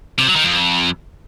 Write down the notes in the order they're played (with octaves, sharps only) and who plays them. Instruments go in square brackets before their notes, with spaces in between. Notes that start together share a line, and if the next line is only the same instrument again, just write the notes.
[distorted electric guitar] C3
F#3
D#3
F2